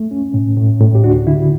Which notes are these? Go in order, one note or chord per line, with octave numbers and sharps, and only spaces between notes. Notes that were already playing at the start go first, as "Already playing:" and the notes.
Already playing: A3
C#4
A2
A2
A2
G4
D2 D4 F#4
D3 E4